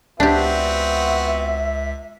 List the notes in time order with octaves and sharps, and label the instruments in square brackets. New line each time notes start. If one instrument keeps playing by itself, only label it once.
[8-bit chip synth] C#2 B6 [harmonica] B3 C4 F#4 [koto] D4 G4 [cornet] E5